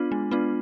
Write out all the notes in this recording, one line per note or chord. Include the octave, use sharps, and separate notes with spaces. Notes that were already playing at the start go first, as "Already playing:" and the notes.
Already playing: B3 D4 F4
G#3
B3 D4 F4